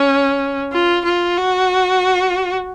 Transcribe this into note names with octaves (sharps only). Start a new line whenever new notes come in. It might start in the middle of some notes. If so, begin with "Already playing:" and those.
Already playing: C#4
F4
F4
F#4